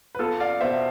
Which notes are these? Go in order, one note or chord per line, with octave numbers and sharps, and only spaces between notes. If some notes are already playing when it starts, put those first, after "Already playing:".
B4
E2 F4 A4
D5 F5
B2 B3 C5 E5